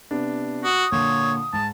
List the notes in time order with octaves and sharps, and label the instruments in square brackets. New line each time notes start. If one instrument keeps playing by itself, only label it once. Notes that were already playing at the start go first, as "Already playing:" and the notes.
[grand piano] C3 B3 D4
[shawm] F#4 [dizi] D#6
[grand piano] A#2 D3 [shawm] C#5
[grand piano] G#2 [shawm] A5